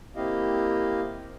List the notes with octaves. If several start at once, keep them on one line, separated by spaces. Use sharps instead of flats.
A#3 C4 E4 G4 D#5 F5